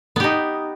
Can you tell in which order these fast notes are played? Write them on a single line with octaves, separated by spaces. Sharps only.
B3 G4 D#4